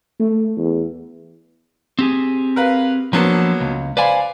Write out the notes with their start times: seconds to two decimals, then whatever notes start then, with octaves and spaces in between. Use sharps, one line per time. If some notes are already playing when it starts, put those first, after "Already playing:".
0.20 A3
0.57 E2
1.99 C4 G4 G#4
2.56 A#4 B4 F5
3.13 F3 F#3 A#3 B3 D4 A4
3.60 C#2
3.97 B4 C5 D5 F5 G#5 B5